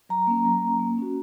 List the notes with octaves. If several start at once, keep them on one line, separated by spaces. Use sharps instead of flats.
F#3 A#5
A#3 C#4
F#3
A#3 C#4
A#3
C#4 F#4